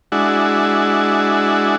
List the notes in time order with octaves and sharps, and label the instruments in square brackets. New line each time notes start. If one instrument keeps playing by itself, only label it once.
[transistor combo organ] G#3 D4 E4 F#4